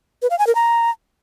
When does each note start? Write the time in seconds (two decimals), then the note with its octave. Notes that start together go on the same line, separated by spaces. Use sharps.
0.22 B4
0.30 F5
0.39 G#5
0.47 A#4
0.55 A#5